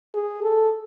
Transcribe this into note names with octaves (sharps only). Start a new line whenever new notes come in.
G#4
A4